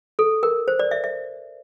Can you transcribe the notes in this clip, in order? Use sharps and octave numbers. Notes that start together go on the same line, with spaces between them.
A4
A#4
C5
D5
E5
E5